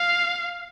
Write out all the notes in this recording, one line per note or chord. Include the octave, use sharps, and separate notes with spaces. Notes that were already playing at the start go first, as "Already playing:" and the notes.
Already playing: F5